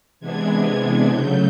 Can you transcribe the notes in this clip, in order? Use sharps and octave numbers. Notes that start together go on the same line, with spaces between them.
C3 E3 G#3 B3 D4 G#6
C#3 F#3 A3 G6